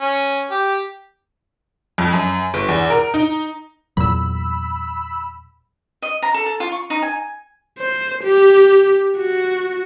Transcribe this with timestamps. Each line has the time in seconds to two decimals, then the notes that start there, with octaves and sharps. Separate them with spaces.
0.01 C#4
0.51 G4
1.98 F2
2.13 F#2
2.54 G1
2.69 E2
2.90 A#4
3.14 D#4
3.97 E2 A#2 F#3 B5 E6
6.02 D#5
6.22 A#5
6.34 A4
6.46 A4
6.60 F4
6.72 C#6
6.90 D#4
7.02 G#5
7.79 C5
8.24 G4
9.18 F#4